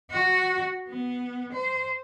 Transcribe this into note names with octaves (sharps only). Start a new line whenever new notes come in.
F#4
B3
C5